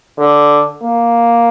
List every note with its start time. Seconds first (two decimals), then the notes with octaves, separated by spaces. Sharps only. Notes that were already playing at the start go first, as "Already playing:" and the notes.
0.18 D3
0.83 A#3